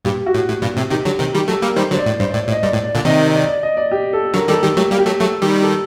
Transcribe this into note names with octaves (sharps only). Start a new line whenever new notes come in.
G2 A#2 G4
F#4
A2
A2
G2 A#2
A2 C3
C3 D#3 G4
D3 F#3
C3 D#3
D#3 G3 G4
F#3 A3 A4
G3 A#3 A#4
D#3 G3 C5
D3 F#3 C5
D5
A2
G2 C5
D5
A2
D5
A2
D#5
G2 D5
A2
D5
A#2 D3
C3 D#3 D#5
D#5
D5
D5
D#5
D5
G4
A4
D3 F#3 A#4
D#3 G3 A4
D#3 G3 G4
F#3 A3 G4
G3 A#3
G4
F#3 A3
F#3 A3 A4
D#3 G3 G4
A4